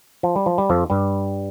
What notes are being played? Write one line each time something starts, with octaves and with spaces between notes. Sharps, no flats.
F3
G3
F3
G3
F2 F3
G2 G3